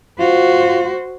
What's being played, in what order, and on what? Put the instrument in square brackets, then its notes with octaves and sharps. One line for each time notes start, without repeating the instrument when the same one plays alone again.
[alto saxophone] F4 [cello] F#4 C5